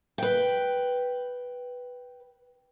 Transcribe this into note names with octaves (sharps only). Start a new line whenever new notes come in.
B4 G5